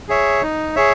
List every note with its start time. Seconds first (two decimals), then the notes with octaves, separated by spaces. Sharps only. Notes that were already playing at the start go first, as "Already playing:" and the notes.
0.08 G#4 C#5 E5
0.42 D#4
0.76 G#4 C#5 E5